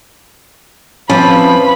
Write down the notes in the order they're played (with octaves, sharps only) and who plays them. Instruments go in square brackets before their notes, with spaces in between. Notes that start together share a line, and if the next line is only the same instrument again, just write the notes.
[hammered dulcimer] E3 F5 D6 [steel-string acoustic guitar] F3 [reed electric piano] C4 C#4 [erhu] B5